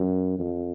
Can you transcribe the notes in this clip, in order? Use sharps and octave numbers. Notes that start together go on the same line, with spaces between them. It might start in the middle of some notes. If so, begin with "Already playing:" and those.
Already playing: F#2
F2